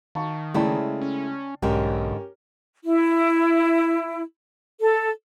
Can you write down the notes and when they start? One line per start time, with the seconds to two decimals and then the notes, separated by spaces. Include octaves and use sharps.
0.15 D#3 F5 A5 C#6
0.54 C#3 G#3 A3 E4 D5 G5 A5
1.02 C#4
1.62 B1 G#2 D3 C#4 G4 A#4
2.86 E4
4.80 A4